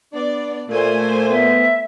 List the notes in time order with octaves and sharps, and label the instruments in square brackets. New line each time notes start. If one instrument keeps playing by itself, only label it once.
[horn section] B3 D4 [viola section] D5
[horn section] A#2 [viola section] A3 C5 G#5
[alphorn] B3 [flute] E5